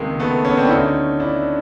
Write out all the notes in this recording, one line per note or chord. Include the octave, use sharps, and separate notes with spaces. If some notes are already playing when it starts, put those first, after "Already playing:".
Already playing: C#2 C3 D#3 G#3 A#3
A3 B3
B3 C#4
C4 D4
E4
D2 D3 C#4 D#4
D4 E4